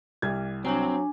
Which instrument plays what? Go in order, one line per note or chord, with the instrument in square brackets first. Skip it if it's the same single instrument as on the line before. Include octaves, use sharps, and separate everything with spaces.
[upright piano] C2 G3 G#6
[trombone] F#3 [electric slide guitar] C4 [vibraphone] D4 G#5